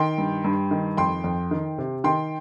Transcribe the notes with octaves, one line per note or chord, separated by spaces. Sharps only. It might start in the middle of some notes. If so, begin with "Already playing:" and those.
Already playing: D#3 G5 C6
G2
G2
D#3
F2 G5 C6
F2
D#3
C3
D#3 G5 C6